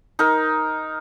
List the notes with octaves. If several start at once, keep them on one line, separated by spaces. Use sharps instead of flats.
D#4 A#4